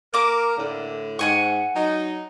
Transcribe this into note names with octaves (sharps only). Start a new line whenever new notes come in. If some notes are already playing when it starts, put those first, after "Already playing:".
A#3 A#4 D6
A2 D3
G#2 F#5 G#5 C#6
F#3 D#4